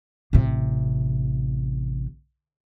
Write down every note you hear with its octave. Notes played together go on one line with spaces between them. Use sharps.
A1 C3